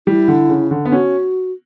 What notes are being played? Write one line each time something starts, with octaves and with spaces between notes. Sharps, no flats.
G3 E4
D3
C#3
D3
B3
C#4 F#4